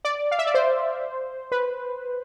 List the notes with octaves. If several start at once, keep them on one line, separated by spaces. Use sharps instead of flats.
D5
F5
E5
D5
C5
B4